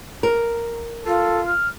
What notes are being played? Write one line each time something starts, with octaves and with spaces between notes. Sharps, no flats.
A#4
F4 A4
F6